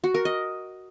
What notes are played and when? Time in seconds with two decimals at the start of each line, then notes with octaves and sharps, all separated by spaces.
0.04 F#4
0.14 A#4
0.25 D#5